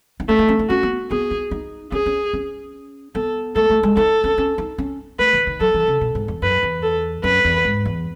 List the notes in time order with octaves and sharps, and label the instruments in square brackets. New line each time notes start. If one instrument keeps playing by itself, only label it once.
[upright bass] D#4
[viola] A3 [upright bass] C#4
[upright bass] D#4
C#4
D#4
[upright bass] C#4 [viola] F#4
[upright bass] B3
[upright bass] B3 [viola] G#4
[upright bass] D#4
D#4
[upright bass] C#4 [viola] G#4
[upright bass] C#4
C#4
[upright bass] B3 [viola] A4
[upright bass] A3 [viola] A4
[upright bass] A3
G#3
[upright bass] D#4 [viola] A4
[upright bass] C#4
C#4
D#4
C#4
[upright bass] A3 [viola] B4
[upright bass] D#3
D#3
[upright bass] F#3 [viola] A4
[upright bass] E3
C#3
B2
G#2
E2
[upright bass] F#2 [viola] B4
[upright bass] E2
[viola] A4
[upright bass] F#2 [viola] B4
[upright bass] E2
G#2
E2